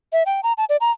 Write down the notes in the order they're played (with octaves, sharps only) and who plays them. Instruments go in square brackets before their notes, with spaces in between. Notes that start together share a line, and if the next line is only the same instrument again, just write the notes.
[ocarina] E5
G5
A#5
A5
D5
A#5